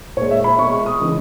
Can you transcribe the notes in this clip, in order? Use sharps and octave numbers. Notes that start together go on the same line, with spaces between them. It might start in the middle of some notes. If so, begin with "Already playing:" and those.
A#2 G#3 C#5
E5
B5
B2 G#3 C#6
C#6
D#6
C#3 E3 G#3